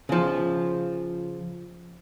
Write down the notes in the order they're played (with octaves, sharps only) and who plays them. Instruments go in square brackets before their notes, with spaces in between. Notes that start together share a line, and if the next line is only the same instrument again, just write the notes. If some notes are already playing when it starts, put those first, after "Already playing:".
[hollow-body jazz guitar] C#3 F3